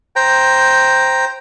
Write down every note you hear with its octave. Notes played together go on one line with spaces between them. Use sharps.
C5 G5 A#5